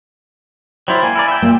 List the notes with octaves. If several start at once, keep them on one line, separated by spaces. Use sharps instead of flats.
F#3 E4 A#4 C5 D5 G5
A#3 G#5
E4 A#4 D5
E5 G5
A#2 A#3